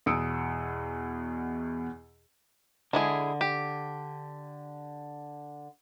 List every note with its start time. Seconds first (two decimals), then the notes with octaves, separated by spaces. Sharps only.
0.06 E2 B2 D#6 E6 C#7 D7
2.93 D3 G#3 E4 G#4
3.41 G4